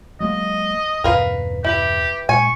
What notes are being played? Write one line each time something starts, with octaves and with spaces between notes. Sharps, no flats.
F#3 G#3 A#3 D#5
E2 G2 B2 A#4 B4 F5
E4 G4 B4
A#2 G#3 G#5 C#6